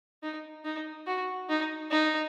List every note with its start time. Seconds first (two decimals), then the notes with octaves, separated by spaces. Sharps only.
0.23 D#4
0.65 D#4
1.07 F#4
1.49 D#4
1.91 D#4